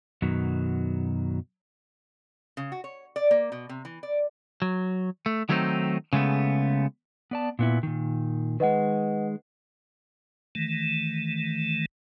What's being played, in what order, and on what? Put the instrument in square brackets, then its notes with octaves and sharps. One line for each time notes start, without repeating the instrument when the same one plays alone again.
[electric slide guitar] F#2 B2 D#3 F#3
[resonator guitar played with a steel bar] C#3
F#4
C#5
D5
A#3
B2
C3
E3
D5
[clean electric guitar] F#3
A3
D#3 F#3 A3 B3 C4 D#4
C#3 G#3 A3 B3
[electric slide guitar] B3 D5 A5
A#2 B3 E4
A#2 D#3
[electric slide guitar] D#3 G#3 [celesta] B4 D#5 F#5
[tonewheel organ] D#3 E3 A3